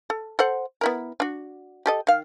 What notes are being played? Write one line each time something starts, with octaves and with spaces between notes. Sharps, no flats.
A4
A4 C5 F#5
B3 E4 A#4
D4 F#4
G4 A4 D#5
D#3 F5